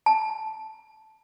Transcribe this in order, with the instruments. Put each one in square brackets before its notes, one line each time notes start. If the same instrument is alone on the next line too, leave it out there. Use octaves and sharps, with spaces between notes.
[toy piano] A5